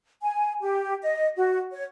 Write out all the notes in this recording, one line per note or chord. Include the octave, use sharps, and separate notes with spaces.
G#5
G4
D#5
F#4
C#5